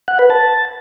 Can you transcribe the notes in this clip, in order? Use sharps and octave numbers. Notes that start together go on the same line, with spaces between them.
F#5
B4
A5